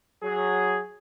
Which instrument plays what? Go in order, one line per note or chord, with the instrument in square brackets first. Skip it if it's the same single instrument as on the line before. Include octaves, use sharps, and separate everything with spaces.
[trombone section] F#3 G#4